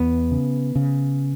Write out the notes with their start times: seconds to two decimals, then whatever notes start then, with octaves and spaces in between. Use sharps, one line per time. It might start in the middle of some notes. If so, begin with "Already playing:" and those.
Already playing: E2 B3
0.31 C#3
0.75 C#3